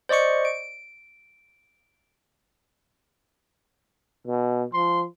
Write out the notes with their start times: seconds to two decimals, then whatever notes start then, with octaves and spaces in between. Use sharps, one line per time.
0.09 C5 D5 D#5 C#6 C#7
0.45 D7
4.27 B2
4.74 F3 C6